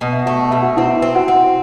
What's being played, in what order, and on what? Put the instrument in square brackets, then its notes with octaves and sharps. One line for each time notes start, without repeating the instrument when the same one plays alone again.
[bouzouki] B2 [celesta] F#5
[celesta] E5
[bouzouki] A3 [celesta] F#4 F#5
[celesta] F#5
[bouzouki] B2 [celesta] E5
[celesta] F#4 F#5
[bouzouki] C4 [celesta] E4 E5
[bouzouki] C4
[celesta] F#4 F#5
[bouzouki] C4